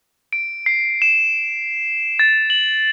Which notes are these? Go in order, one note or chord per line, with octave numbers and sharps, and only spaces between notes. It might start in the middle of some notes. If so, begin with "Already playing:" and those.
D7
C7
E7
A6
F#7